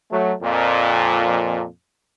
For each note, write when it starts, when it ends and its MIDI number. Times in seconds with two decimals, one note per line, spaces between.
0.11 0.33 54
0.11 0.33 57
0.43 1.64 41
0.43 1.64 46